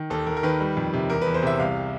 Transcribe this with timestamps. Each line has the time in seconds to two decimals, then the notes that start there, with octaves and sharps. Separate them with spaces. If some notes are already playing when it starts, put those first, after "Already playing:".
Already playing: D#3
0.10 D#2 A4
0.27 D#2 A#4
0.37 A#4
0.43 D#3 B4
0.60 G3
0.77 F2
0.93 C3
1.09 E2 A#4
1.21 B4
1.26 E2
1.34 C5
1.42 C3 E5
1.60 C2 F5